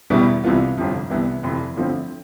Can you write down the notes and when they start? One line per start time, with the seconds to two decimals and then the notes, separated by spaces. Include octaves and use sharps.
0.10 E2 B2 G3 B3 E4
0.44 C2 C3 E3 B3 F4
0.77 G1 F2 C3 F3
1.10 C2 C3 E3 B3
1.43 F1 F2 E3
1.76 G1 G2 F3 A3 C4